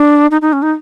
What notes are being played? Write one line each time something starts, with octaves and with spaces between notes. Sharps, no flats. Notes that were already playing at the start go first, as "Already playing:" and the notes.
Already playing: D4
D#4
D#4
C#4
D#4